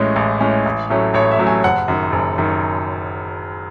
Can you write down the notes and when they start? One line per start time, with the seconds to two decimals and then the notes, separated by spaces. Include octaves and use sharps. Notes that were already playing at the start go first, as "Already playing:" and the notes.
Already playing: A1 A2 G#3 C#4 D#5
0.16 A1
0.40 A2 G#3 C#4
0.66 A1
0.90 A2 F#3 A3 C#4
1.14 A1 C#5
1.31 E5
1.38 A2 F#3 A3 C#4
1.47 G#5
1.64 F#1 F#5
1.88 F#2 D#3
2.12 F#1
2.38 F#2 D#3